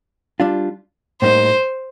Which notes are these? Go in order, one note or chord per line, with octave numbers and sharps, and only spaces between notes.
G3 D4 F4
A2 G3 A#3 D#4 C5